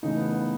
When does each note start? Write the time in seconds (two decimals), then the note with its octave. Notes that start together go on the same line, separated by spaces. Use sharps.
0.03 C#3 E3 A3 D#4
0.17 B3
0.31 B3